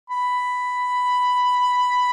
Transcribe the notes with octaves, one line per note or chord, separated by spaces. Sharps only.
B5